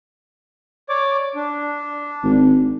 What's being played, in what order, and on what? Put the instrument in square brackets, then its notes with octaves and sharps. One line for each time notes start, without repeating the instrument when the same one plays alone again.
[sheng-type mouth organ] C#5 D5 D6
D4
[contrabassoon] G#1